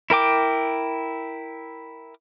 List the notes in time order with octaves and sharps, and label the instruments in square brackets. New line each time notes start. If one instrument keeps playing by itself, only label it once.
[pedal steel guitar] E4 A#4 G5 D6